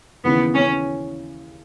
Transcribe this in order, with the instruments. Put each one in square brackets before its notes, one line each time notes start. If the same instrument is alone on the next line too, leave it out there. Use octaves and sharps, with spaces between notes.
[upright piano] D#2 C#3 E3 [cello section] B3
[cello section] C#4